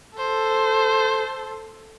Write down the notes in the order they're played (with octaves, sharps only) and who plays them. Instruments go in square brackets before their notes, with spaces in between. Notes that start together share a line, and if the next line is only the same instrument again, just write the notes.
[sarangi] A4 [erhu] C5